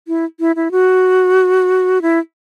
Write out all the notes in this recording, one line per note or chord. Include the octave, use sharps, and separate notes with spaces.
E4
E4
E4
F#4
E4